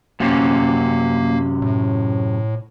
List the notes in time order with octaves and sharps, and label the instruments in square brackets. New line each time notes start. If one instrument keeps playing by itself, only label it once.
[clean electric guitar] F#2 C3 C#4 [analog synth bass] A#3
[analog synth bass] A2